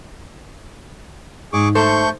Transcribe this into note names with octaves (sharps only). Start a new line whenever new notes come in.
G#2 G#4 C#6 D6
A3 A4 C5 C#6 G6